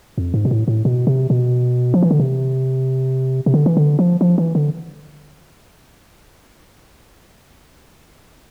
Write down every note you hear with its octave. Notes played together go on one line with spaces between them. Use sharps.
F2
G#2
B2
A2
A2
B2
C3
B2
F3
E3
D3
C3
C3
D3
E3
D3
F3
F3
E3
D3